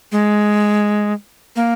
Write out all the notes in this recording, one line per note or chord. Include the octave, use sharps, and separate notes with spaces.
G#3
A#3